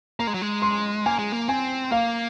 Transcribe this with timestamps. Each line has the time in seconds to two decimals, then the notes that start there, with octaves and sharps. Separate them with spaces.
0.19 A#3 A#5
0.27 G#3
0.34 F#3
0.42 G#3
0.62 C6
1.06 A#3 G#5
1.19 G#3
1.32 A#3
1.48 C4 G#5
1.91 A#3 F5